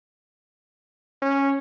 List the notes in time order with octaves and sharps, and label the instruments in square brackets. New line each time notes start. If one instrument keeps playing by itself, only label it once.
[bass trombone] C#4